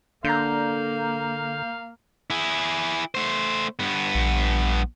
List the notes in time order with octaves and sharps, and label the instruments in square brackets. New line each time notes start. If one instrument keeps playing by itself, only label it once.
[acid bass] D3 [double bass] A#3 [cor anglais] F5 [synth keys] A#5 G6
[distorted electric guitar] E4 G#4
A3 C5
G2 B3
[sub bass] A#1